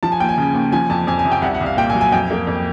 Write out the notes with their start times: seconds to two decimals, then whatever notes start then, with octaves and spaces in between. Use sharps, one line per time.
0.03 F3 A5
0.12 G#5
0.20 D#2 G5
0.29 G#5
0.38 C#3
0.55 D#2
0.72 F3 G#5
0.89 F2 A5
1.07 F2 G#5
1.19 G#5
1.24 C3
1.32 G5
1.42 C2 F#5
1.55 F#5
1.61 C2
1.66 F5
1.77 A#2 G5
1.90 G#5
1.95 F#3
2.01 G#5
2.12 F2 G5
2.31 A#3
2.47 F2